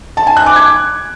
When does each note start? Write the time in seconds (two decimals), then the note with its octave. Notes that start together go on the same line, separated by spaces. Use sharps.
0.17 A5
0.27 G#5
0.37 F#6
0.46 D6
0.56 G#6